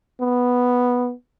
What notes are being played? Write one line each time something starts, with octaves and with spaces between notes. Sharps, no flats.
B3